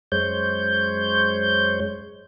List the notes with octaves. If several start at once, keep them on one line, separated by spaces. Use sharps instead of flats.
F#2 G#3 C5 C#5 G6